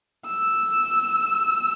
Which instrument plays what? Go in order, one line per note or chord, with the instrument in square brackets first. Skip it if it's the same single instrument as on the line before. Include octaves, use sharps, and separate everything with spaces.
[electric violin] E6